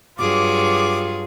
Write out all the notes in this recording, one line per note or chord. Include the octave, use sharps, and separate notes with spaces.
G2 F#3 F4 G#4 D6